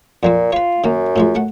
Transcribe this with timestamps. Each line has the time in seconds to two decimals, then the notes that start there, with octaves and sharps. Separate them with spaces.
0.23 F2 A#2 F3 C4
0.52 F4 B4 C#5
0.84 F#2 D#3 A#3
1.16 A2 F3 G#3
1.35 A3 F#5